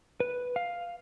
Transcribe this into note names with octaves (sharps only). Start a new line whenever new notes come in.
B4
F5